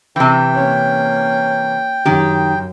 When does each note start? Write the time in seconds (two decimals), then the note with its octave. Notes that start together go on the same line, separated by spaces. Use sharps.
0.16 C3 E3 G5
0.54 A#3 C#4
2.05 F#2 D#3 G4